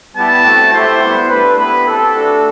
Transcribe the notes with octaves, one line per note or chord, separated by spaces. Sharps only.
G3 B3 E4 G4 A5
A3 C4 F#4
A3 E4 G4 C5
G3 B3 E4
A3 D4 G4 B4
B3 E4 G4 B4
C4 G4 A4
A3 D4 F#4